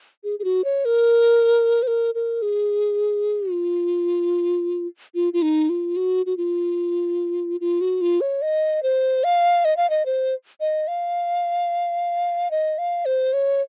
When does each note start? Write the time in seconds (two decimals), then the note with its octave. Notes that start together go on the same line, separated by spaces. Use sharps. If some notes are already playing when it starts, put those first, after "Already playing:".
0.24 G#4
0.39 G#4
0.44 F#4
0.64 C#5
0.85 A#4
1.83 C5
1.87 A#4
2.15 A#4
2.42 G#4
3.51 F4
5.15 F4
5.33 F4
5.42 D#4
5.69 F4
5.96 F#4
6.26 F#4
6.37 F4
7.61 F4
7.81 F#4
8.01 F4
8.21 C#5
8.42 D#5
8.83 C5
9.24 F5
9.65 D#5
9.77 F5
9.90 D#5
10.06 C5
10.60 D#5
10.88 F5
12.51 D#5
12.78 F5
13.05 C5
13.33 C#5